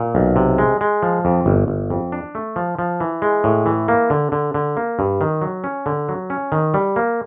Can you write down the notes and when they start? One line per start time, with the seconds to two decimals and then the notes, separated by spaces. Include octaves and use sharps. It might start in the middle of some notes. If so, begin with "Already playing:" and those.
Already playing: A#2
0.15 B1
0.36 C3
0.58 G#3
0.81 G#3
1.03 F3
1.25 F2
1.46 G1
1.68 G1
1.90 F2
2.12 D4
2.35 A3
2.56 F3
2.79 F3
3.00 E3
3.22 G#3
3.44 A2
3.66 E3
3.88 A#3
4.10 D3
4.32 D3
4.54 D3
4.77 A#3
4.99 G2
5.21 D#3
5.42 F#3
5.64 C#4
5.86 D3
6.09 F#3
6.30 C#4
6.52 D#3
6.74 G3
6.96 A#3